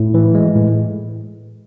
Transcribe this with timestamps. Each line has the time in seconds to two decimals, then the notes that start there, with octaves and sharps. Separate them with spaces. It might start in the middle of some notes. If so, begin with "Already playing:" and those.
Already playing: A2
0.14 E3
0.35 G#3
0.55 A2